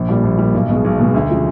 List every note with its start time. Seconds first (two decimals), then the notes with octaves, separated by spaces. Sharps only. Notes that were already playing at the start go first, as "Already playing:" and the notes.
Already playing: A#1
0.08 A#2 G3
0.23 A#1
0.38 A#2 G3
0.54 B1
0.69 B2 G#3
0.84 B1
0.99 B2 G#3
1.14 D2
1.29 C#3 F3 G#3